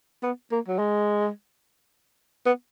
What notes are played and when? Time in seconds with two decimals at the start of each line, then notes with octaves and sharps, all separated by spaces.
0.23 B3
0.51 A#3
0.68 F#3
0.79 G#3
2.46 B3